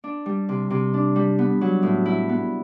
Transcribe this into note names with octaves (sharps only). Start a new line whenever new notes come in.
D4
G3
C3
C3
D4
G3
B3
F#3
A2
E4
B3